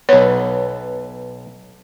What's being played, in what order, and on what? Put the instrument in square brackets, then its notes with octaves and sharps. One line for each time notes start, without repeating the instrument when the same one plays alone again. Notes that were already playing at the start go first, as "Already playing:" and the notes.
[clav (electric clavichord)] B1 B3 [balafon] C#5